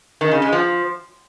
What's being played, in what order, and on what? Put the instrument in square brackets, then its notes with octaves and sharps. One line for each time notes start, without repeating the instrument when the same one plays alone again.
[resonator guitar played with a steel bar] D#3
C#3
G#3
F3